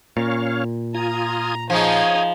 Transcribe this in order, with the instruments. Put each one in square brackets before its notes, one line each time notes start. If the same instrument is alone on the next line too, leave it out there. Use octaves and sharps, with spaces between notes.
[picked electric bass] A#2 [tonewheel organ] C#4 C#5 F5
[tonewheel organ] F4 G#5 D#6 [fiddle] A#5
[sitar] F3 [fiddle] D#4 G#4 [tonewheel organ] C#5 G#5 D#6